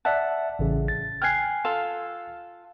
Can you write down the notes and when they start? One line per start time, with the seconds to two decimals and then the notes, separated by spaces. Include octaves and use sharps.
0.05 D5 E5 F#5 A5
0.59 A1 C#3
0.88 A6
1.22 G5 G#5 F6 F#6 C7
1.65 F4 A4 F5